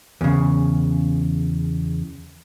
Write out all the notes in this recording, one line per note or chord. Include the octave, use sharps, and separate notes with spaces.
E2 C#3